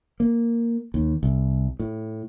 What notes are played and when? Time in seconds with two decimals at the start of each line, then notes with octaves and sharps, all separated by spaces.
0.20 A#3
0.94 D#2
1.23 C2
1.80 A2